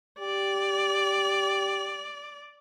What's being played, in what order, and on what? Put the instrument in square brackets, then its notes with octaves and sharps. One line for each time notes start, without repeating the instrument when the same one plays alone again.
[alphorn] G4 [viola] D5